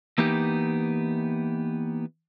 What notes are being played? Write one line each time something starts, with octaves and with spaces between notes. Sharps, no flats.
E3 A#3 B3 D#4 G4